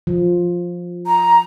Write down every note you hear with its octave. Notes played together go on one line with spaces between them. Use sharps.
F3
A#5